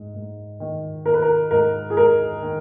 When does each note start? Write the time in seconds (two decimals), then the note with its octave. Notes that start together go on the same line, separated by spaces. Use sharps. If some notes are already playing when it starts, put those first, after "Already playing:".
Already playing: G#2
0.14 G#2
0.60 D#3
1.05 D#3 A#4
1.14 B4
1.22 A#4
1.51 G#2 A#4
1.90 G#4
1.97 G#2 A#4
2.43 D#3